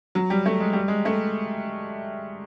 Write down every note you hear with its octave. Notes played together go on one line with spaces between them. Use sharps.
F#3
G3
A3
G#3
G3
G#3
A3